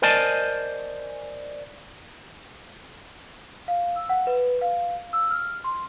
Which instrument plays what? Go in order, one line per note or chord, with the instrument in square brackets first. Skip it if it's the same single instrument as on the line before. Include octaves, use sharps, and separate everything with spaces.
[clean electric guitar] A#4 C5 D5 D#5 G#5 A5
[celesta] F5
E6
F#5
B4
F5
E6
F6
C6